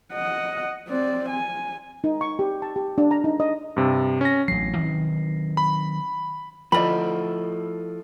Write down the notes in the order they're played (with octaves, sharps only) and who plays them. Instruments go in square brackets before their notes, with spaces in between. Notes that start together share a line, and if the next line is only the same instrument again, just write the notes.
[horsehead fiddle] D#5 F#5
C4 D5
G#5
[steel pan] D#4
C#6
G4
A5
G4
D4
A#5
D#4
D#5
[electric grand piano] G2 C3
C#4 A#6
[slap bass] A1 F#3 [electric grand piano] C7
[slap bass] D#3 F#3 C4
[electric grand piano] B5
[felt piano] F3 [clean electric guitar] E4 A4 D#5 [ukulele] D5 B5